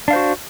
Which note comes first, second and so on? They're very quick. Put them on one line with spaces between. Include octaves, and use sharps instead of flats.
D4 F5 C5 F#4